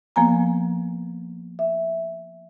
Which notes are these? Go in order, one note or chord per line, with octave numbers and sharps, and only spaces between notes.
F3 A#3 B3 G#5 A#5
E5